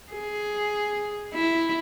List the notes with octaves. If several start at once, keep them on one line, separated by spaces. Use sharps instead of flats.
G#4
E4